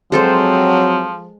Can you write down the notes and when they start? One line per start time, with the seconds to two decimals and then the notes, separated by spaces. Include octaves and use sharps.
0.12 F3 F#3 G#3 C4 A4 C5